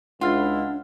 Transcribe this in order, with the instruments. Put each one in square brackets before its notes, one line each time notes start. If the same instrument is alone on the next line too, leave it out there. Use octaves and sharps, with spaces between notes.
[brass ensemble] C#2 E4 [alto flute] D4 [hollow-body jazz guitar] F4 [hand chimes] F#5 F6 A6